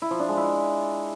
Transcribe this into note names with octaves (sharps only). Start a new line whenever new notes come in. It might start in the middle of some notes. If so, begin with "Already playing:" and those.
E4
F3
D4
G#3
E4